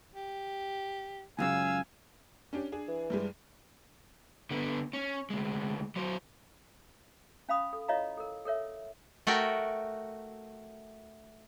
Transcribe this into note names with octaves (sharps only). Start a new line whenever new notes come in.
G4
C#2 F#2 C#3 F5 G#5 E6
C#4 D4 G4
D4 G#4
E3
G2 G3 G#3
D3 B3
C#4
D2 G#3
F#3 C5
C#4 F5 B5 D#6
A4
E4 F4 C#5 D#5 F5 A#5
A4 A#4
A4 A#4 C#5 E5
A3 F#4 A#4 G5